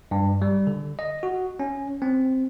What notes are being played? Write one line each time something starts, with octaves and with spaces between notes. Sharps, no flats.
G2
G3
D3
D#5
F#4
C#4
C4